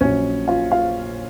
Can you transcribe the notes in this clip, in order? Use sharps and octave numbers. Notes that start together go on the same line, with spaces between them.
A#1 A#2 F#3 C#4 C#5
F4 F5
F4 F5